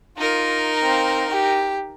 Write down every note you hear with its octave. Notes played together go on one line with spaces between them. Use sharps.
D#4 F4 A#4
C4 F5
G4